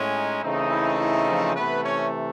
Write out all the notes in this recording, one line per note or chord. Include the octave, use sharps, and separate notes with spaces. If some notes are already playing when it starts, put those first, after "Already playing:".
Already playing: A2 G#3 C#4
D#4
C#3 E3 A3 C4 D#4
E4
E4
F3 F4
C3 E3 A3 B3 B4
C#4 C#5